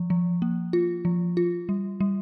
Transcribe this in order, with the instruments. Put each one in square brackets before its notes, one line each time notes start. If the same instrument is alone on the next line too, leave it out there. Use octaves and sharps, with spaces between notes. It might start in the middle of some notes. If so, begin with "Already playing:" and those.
Already playing: [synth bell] F3
F3
A#3
F4
F3
F4
G3
G3